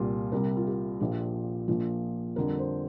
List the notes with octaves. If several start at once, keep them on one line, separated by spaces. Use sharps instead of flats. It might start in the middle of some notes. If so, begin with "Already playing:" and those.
Already playing: C2 A#2 G3 F4
C2 C3 G3 A#4
F4
G4
A#1 A#2 F3
A#1 A#2 F3
F2 D3 G3 A#4
C5